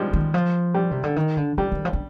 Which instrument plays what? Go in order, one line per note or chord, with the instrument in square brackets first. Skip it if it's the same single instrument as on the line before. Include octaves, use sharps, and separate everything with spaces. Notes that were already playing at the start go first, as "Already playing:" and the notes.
Already playing: [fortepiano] F3 G3 G#3
[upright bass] D#3
F3
[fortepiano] G3
[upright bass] C3
D3
D#3
D3
[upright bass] D3 [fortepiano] G3
[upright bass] D#3
F3
D3